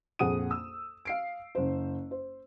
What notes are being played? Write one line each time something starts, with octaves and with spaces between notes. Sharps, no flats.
A#1 F2 G#4 F#5 D#6 D#7
E6
F5 C7 D7
F#1 C5
C5